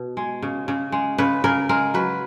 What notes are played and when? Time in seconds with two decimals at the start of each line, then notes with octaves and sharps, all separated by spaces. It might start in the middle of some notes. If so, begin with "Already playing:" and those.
Already playing: B2
0.17 G#3
0.42 C#3
0.68 C#3
0.92 G#3
1.18 C#3 B4
1.44 C#3 A#4
1.69 G#3 A#4
1.94 F#3 B4